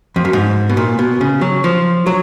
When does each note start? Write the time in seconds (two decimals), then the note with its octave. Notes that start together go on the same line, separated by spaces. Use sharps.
0.16 F2
0.25 F#2
0.33 G#2
0.69 B2
0.77 A#2
0.99 B2
1.21 C#3
1.41 F#3
1.64 F3
2.06 F#3